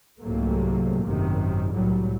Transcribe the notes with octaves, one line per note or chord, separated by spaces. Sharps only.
C2 G#2 C3 F#3 A3 A#3
G#1 F#2 C3 D#3
C2 A2 F#3 G3